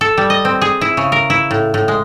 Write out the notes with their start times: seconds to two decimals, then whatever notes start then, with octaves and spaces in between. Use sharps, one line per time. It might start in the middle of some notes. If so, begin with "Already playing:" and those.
0.01 A4
0.17 G3
0.30 D#5
0.45 C4
0.62 G#4
0.81 E4
0.97 C#3
1.12 A#4
1.30 E4
1.51 A2
1.74 A2
1.88 G#3